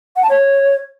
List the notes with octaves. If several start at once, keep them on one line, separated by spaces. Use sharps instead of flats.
F#5
A5
C#5